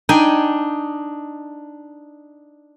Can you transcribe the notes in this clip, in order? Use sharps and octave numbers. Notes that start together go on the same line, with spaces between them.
D4 D#4 G5 G#5